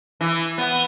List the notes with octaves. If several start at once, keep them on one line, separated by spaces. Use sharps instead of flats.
E3
B3